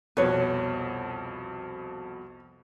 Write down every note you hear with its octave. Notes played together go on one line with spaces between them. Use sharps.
C2 F2 B2 B4 C#5